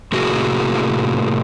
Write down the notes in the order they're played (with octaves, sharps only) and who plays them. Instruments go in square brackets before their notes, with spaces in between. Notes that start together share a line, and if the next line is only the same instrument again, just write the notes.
[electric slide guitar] A2 C3 A#3 F#4 G#4